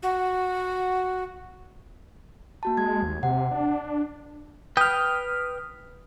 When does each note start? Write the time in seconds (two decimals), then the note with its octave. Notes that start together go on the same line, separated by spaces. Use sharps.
0.03 F#4
2.63 A#3 F#4 A5
2.77 G#3 G#6
3.03 D#2
3.23 C3 F#5
3.51 D4
4.77 B4 G5 D#6 F6